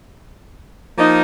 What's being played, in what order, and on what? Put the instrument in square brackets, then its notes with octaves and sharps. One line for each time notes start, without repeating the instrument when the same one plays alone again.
[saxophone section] F3 A#3 D#4